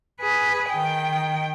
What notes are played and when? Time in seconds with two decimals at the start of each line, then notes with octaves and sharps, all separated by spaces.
0.21 G#4 B4
0.70 D#3 G5